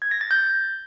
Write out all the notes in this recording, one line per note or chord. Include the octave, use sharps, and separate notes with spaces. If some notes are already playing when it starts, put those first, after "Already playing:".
G#6
A#6
A6
G6